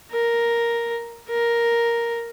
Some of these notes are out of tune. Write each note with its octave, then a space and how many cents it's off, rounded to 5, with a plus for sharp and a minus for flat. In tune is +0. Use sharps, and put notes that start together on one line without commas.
A#4 +5
A#4 +5